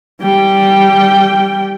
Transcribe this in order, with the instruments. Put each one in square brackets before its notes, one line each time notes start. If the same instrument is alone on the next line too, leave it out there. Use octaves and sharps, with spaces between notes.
[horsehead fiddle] G3 G5